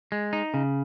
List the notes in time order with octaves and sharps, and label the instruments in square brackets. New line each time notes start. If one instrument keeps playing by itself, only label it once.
[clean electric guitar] G#3
D#4
C#3